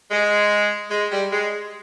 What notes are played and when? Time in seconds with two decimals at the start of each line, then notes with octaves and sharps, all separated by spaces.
0.11 G#3
0.91 G#3
1.11 G3
1.31 G#3